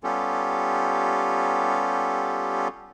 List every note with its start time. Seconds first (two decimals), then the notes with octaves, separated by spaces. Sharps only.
0.04 G3 B3 C#4 F4 G4 A4